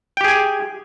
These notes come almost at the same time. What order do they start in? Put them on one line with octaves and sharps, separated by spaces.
G5 G4 G#4 G#5